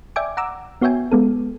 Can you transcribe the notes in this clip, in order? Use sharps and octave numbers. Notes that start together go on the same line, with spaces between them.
D5 E5 G5 G#5 D6
F#5 A#5 D6 E6
B3 F#4 C#5 E5 G5 G#5
G#3 B3 A4